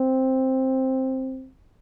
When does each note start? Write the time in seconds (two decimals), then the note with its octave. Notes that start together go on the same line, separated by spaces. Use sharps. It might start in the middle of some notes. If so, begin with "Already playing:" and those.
Already playing: C4